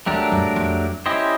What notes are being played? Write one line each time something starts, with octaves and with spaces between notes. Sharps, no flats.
E2 F#3 A3 D4 G4 A#4
F#2
F2
C#4 E4 G4 C5 D#5